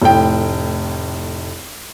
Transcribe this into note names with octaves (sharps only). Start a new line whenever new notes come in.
F1 A2 G5